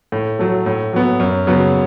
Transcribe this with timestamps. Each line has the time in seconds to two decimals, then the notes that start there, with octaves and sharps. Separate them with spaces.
0.12 A2
0.39 F#3 A3
0.66 A2
0.93 F#3 B3
1.20 F#2
1.47 C#3 F#3 B3